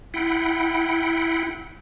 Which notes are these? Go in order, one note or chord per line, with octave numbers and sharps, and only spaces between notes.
E4 F#5 G5